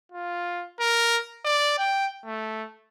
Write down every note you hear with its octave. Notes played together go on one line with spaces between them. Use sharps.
F4
A#4
D5
G5
A3